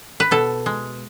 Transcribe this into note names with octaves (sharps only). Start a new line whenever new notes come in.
B4
B2 A4
G#3